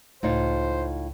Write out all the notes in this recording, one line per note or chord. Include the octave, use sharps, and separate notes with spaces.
C#2 A2 D#4 F4 C5